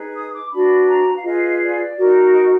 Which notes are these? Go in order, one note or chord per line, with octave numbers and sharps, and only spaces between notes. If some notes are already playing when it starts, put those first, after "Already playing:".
Already playing: D#4 G#4 B4
D#6
D6
D4 F#4 B4 B5
A#5
F5
F4 G#4 B4 D#5
D5
D#4 F#4 A#4
D#5